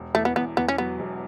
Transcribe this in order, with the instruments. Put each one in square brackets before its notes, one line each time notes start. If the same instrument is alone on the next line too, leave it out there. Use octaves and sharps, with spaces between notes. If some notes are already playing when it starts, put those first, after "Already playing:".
Already playing: [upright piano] E1
[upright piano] E2 [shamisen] A3
[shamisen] B3
[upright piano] E2 [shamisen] B3
[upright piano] E2 [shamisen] B3
[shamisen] C#4
[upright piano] F#3 [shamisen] B3
[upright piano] E1